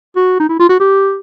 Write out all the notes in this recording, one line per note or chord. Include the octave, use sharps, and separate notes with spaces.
F#4
D#4
E4
F4
F#4
G4